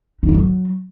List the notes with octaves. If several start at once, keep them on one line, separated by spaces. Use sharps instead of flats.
D#4
D3
F#3